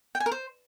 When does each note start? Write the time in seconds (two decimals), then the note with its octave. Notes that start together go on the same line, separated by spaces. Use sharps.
0.15 G5
0.20 G#5
0.26 A#4
0.32 C5